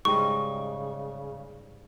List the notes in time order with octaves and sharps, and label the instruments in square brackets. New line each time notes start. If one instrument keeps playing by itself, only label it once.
[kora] G#2 G3 D#5 [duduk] C#3 [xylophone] C#6